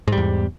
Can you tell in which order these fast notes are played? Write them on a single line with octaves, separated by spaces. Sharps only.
G#2 G3 E2